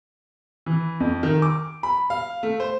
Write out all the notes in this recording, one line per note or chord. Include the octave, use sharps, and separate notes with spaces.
E3
F2
D#3
D6
B5
F5
A3
C5